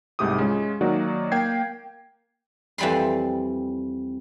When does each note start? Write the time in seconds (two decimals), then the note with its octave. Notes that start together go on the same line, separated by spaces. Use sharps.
0.19 C2 G#2 A3 G4 D6 D#6
0.38 G#3 C#4 F4
0.81 D#3 F#3 A#3 D#4 F#4 D5
1.32 A#3 G5 G#6 C7
2.78 F2 E3 G3 B5 C6